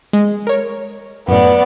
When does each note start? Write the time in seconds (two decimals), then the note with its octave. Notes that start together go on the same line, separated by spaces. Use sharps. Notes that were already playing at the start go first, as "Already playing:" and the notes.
0.13 G#3
0.47 A#4 C#5
1.28 F#2 A2 B3 D5